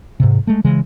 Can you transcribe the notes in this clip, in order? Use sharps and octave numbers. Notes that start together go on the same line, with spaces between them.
G#2 C3
G#3 A3
C#3 E3 G#3